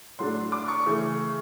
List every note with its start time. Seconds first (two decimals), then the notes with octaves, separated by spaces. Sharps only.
0.18 A2 F#3 A3 D4 C6
0.52 D6
0.68 C#6
0.86 C#3 E3 A3